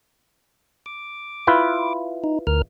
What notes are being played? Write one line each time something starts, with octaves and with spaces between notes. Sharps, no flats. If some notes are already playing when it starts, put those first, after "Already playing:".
D6
E4 F4 B4
D#4
D2 A#4 F6